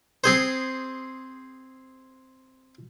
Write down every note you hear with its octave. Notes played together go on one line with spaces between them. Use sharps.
C4 G#4 C5